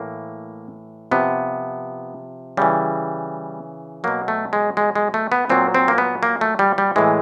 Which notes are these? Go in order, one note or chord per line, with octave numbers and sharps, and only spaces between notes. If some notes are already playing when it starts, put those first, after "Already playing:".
Already playing: A2 E3 A#3
C3 F3 B3
C#3 E3 G3
B2 F#3 A#3
A3
G#3
G#3
G#3
A3
B3
A#2 F#3 C4
C4
A#3
B3
A#3
A3
G3
G3
A2 E3 G#3